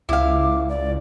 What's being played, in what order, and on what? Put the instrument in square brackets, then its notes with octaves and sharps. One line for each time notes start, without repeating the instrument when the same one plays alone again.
[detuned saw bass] C#2 [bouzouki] E4 F5 [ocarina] D6
[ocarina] D5